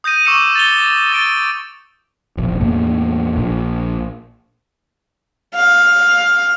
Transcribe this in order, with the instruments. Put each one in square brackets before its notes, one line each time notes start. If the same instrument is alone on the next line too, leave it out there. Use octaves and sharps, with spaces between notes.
[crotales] D#6 G6 A#6 D#7
C#6 D6 E6 C#7 D#7 E7
A6 F7 G7
A6 D7 G7
[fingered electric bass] E1 A#1
E2 A2 A#3
A#1
[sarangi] F5